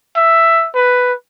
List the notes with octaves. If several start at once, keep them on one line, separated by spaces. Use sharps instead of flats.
E5
B4